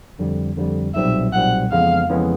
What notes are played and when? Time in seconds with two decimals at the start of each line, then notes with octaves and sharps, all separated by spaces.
0.19 F2 D3 G3
0.57 F2 D3 G3
0.94 B1 A#2 G3 C4 E5
1.33 B1 A#2 G3 C4 F#5
1.71 F2 C#3 E3 G#3 B3 F5
2.10 F2 C#3 E3 G#3 B3